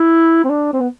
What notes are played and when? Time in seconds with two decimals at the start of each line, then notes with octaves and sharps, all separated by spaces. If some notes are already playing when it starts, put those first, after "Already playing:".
Already playing: E4
0.44 C4
0.50 D4
0.73 C4
0.80 B3